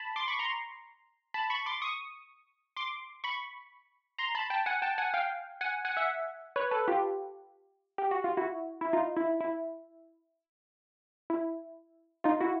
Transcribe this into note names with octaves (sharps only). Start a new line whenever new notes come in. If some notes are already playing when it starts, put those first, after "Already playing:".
Already playing: A5 B5
C6 D6
B5 C#6
A#5 C6
A5 B5
B5 C#6
C6 D6
C#6 D#6
C6 D6
B5 C#6
A#5 C6
A5 B5
G5 A5
F#5 G#5
G5 A5
F#5 G#5
F5 G5
F#5 G#5
F#5 G#5
E5 F#5
B4 C#5
A4 B4
F4 G4
G4
F#4
F4
E4 F#4
E4
D#4 F4
E4
E4
E4
D#4 F4
E4 F#4